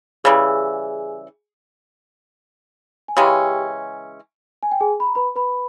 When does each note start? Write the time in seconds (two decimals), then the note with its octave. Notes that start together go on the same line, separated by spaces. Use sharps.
0.24 C#3 E3 G3 G#4 G#5
3.08 G#5
3.17 C#3 E3 G#3 C#4 G4 G5
4.63 G#5
4.72 G5
4.80 G#4 G#5
5.00 B5
5.07 A#5
5.15 B4 B5
5.36 B4 B5